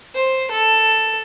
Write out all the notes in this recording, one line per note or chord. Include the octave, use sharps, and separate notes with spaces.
C5
A4